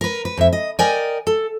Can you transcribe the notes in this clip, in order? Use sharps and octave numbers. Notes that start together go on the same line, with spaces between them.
A#4 B4
B4
F2 E5
D#5
A#4 D5 D#5 G5 G#5
A4